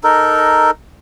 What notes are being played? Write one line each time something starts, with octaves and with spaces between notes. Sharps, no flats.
D#4 A4 A#4